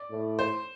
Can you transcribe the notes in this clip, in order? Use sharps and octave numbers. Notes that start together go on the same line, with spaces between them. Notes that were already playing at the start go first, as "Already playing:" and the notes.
Already playing: D5
A2
C5